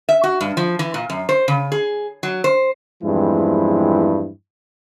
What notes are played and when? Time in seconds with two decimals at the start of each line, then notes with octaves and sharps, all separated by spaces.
0.09 E5
0.24 F#4
0.41 G2
0.57 F3
0.79 E3
0.94 A#2
1.10 F#2
1.29 C5
1.48 C#3
1.72 G#4
2.23 F#3
2.44 C5
3.03 E2 G2 F3 G#3 C4 E4